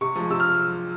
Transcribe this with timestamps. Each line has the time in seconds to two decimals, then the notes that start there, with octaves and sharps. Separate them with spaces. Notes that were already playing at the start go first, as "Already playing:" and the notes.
0.01 C3 C#6
0.15 F3 G#3
0.30 C3 E6
0.40 F6